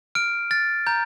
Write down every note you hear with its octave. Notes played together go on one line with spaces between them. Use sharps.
F6 D7
F6 A6
A#5 G6